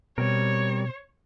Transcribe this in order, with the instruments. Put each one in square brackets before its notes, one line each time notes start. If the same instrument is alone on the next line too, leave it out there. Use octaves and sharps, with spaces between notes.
[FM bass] B2 [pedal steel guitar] G3 C4 A#4 [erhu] C#5